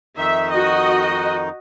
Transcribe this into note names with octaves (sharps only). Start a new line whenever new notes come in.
F2 D#3 D#4 E5
F#4 D#5